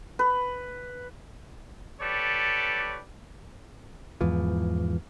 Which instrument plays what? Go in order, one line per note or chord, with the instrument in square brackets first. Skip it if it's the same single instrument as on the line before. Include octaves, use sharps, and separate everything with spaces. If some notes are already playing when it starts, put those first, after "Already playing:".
[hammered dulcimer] B4
[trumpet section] G4 A4 B4 C#5 D5
[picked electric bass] E2 G#2 E3 F3